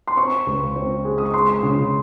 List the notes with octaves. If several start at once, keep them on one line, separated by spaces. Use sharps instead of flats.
C6
C4 C#6
C#2
C4
G#3
D#6
C#6
G#3 C6
C#3